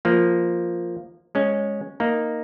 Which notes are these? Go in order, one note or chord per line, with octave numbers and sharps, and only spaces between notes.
F3 A#3
G#3 C#4
A#3 D#4